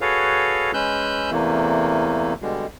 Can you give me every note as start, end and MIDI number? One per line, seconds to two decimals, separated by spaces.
0.01 0.71 66
0.01 0.71 68
0.01 0.71 69
0.01 0.71 71
0.01 0.71 73
0.01 0.71 77
0.74 1.30 56
0.74 1.30 61
0.74 1.30 71
0.74 1.30 88
0.74 1.30 90
0.74 1.30 91
1.31 2.33 40
1.31 2.33 48
1.31 2.33 52
1.31 2.33 57
1.31 2.33 58
2.42 2.66 47
2.42 2.66 50
2.42 2.66 55
2.42 2.66 56